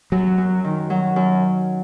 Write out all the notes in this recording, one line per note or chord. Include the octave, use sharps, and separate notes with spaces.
F#2 F#3
F#2
D#3
F#3
F#2